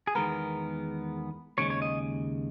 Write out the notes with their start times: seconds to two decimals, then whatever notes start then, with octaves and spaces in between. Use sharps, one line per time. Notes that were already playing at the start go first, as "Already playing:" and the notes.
0.07 G#4
0.15 E2 D#3 G#3 B3 A#4
1.58 D#2 C#3 G#3 C#5
1.70 C#5
1.82 D#5